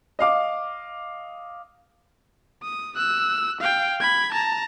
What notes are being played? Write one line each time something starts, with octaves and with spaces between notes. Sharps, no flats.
D#5 F5 D6
D#6
E6 F#6
F5 G5
B5 G#6
A5 A#5